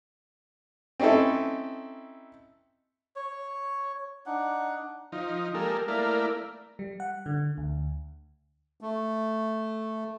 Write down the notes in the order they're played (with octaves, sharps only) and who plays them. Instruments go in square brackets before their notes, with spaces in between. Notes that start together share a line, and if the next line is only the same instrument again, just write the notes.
[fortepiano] C4 C#4 D#4 E4 A4
[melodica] C#5
D4 D#4 F#5
[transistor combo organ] F3 D#4
G3 G#3 A#3 A4 A#4
A3 A#3 E4 A#4 D5 F5
[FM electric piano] G3
F#5
D3
D2
[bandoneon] A3